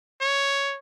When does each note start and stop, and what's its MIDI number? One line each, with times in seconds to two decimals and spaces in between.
0.21 0.77 73